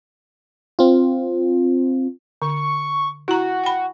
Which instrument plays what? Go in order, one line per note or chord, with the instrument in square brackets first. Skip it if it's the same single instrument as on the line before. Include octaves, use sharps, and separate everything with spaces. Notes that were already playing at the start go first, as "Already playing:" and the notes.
[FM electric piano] C4 F4
[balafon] D3 [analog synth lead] C#6
[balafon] E4 A#5 [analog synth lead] F#4
[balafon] G5 B5